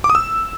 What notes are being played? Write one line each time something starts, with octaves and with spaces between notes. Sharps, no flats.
D6
D#6
E6